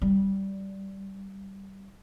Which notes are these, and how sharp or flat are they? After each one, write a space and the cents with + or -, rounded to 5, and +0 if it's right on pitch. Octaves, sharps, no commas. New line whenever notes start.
G3 -10